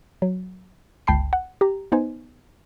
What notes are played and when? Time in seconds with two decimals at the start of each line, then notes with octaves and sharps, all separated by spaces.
0.22 F#3
1.07 G1 C#2 G5 A5 B5 C7
1.33 F#5
1.61 G4 A#5
1.92 B3 D#4 C5 G#5